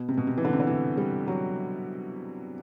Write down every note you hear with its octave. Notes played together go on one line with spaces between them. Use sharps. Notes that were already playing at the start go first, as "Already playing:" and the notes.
Already playing: B2
C3
B2
C3
E3
D3
C3
D3
E3
G3
F#3